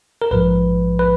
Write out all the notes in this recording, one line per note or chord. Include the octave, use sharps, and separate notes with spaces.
A#4
A#1 G#2 F3 B4
B4